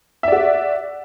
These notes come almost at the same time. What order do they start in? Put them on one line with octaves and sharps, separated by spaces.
E5 D5 F#4